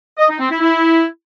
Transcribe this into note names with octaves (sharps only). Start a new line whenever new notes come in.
D#5
D#4
C4
E4
E4